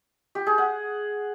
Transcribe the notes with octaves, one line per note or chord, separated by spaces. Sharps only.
G4
G#4
F#5